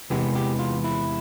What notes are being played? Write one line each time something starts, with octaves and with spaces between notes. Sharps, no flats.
E2 C3 E3 G#3 B3 G4
G4
F4
E4